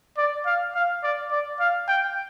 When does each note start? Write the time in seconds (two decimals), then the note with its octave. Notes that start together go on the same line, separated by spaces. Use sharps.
0.18 D5
0.46 F5
0.75 F5
1.03 D5
1.31 D5
1.60 F5
1.88 G5